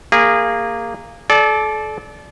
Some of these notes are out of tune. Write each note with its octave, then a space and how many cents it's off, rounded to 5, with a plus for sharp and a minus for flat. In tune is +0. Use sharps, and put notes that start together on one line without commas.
A#3 -10 G#4 -25
A4 -35 D5 +0